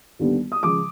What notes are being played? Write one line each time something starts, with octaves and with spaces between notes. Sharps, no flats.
D#2 D3 G3 B3
D#6
C#3 F3 G#3 D6